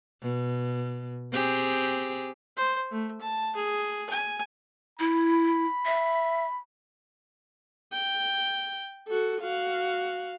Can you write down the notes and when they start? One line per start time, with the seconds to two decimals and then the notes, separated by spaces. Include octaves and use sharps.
0.21 B2
1.32 C4 G4 G#4
2.57 C5
2.91 A3
3.21 A5
3.56 G#4
4.10 G#5
4.99 E4 B5
5.85 E5
7.92 G5
9.08 F#4 A4
9.41 F#4 F5